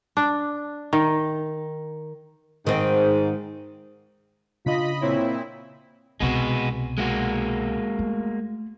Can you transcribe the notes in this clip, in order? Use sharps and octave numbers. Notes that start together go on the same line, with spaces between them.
D4
D#3
G#2 D#3 C4
C#3 D4 F4 D#5 B5 B6
A#2 C4 E4 C#5
C2 B2 G#3 B3 F#4
G#3 A#3 F#4
A3